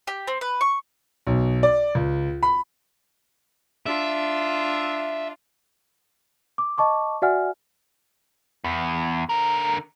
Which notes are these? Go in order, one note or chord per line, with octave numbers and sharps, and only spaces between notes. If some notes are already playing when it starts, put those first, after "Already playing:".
G4
C4
B4
C#6
B1
D5
C#2
B5
D4 F4 E5
D6
D#5 A5 C#6 D6
F#4 D5 E5 F#5 G#5 F6
E2
D3 A#4